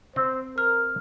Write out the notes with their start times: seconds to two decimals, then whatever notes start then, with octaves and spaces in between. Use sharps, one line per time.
0.16 C4 C5
0.58 A#4 F6